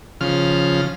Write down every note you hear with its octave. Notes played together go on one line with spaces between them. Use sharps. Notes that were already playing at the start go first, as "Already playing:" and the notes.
C#3 F3 F6